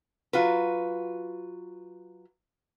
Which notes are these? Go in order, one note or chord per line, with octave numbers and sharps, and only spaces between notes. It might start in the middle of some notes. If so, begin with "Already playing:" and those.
F#3 F4 F#4 B4